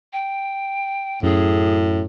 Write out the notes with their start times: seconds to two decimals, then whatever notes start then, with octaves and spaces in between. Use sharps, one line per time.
0.12 G5
1.23 F#2 A2 G#4